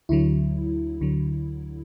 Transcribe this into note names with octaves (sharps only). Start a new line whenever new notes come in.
D2 D3 F#3 E4
D2 D3 F#3